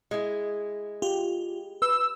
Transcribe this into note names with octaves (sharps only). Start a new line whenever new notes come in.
G#3 E4
F4 G4
B4 E6